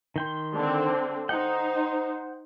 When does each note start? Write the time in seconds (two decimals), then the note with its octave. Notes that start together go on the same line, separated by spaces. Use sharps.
0.16 D#3 G5 C6
0.54 D3 C4
1.29 D#4 C5 F#5 G5